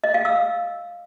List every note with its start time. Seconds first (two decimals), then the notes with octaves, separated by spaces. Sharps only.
0.04 D#5
0.14 F5
0.25 E6